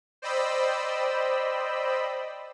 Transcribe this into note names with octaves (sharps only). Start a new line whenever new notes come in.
C5 D5 D#5 G5 B5 E6